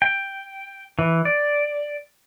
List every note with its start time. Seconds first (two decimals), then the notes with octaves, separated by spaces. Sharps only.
0.02 G5
0.99 E3
1.25 D5